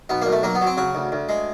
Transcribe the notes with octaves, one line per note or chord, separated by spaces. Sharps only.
B1 B3
B1 A#3
A3
F#3 A#3
B3
F#3
C4
C#3 F#4
D2
D2
G#3